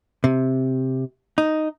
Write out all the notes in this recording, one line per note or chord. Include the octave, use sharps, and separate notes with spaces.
C3
D#4